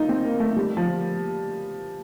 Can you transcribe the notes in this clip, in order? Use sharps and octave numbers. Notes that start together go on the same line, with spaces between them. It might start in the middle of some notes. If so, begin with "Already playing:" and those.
Already playing: D#4 F4 A#4
C4
A#3
A3
G3
F3